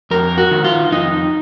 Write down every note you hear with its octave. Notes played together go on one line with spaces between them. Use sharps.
F2 A#4
F#4
D#3
F4
F2 D#4